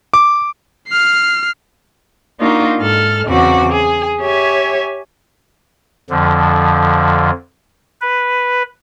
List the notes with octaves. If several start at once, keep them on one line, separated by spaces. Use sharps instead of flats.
D6
F6 C7
A#3 D4 D#4 F4 F#4
G#2 A4 F6
E2 C#3 C4 F#4 D6
G#4
G4 C#5 E5 G#5
F2 D3 F3
B4